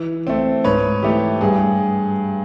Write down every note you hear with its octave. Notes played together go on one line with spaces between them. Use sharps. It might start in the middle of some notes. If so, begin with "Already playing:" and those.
Already playing: E3
A3 C4
G#2 B4 C#5
E3 A3 G4
G2 G#4